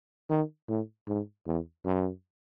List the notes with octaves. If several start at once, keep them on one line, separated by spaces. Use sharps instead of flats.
D#3
A2
G#2
E2
F#2